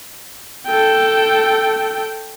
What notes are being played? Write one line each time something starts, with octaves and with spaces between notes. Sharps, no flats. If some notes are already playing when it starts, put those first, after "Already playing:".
A4 G5